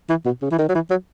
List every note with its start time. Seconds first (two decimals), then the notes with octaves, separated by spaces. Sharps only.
0.09 E3
0.25 B2
0.42 C#3
0.51 E3
0.58 D#3
0.69 F#3
0.75 E3
0.90 F#3